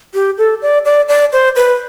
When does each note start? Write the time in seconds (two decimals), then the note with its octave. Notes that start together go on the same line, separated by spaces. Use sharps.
0.14 G4
0.38 A4
0.62 D5
0.85 D5
1.09 D5
1.33 C5
1.56 B4